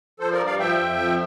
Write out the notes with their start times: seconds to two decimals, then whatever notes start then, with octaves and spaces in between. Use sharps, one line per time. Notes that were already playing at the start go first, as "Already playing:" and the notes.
0.19 F3 A4 C5
0.32 A#4 D5
0.40 G2
0.46 D5 F5
0.59 F3 E5 G5
0.79 F2
0.99 F3